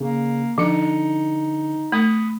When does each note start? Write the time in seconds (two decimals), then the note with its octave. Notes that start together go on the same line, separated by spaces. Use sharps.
0.01 C#3 A#3
0.58 D3 F3 D#4 C#7
1.92 A3 B5 D#6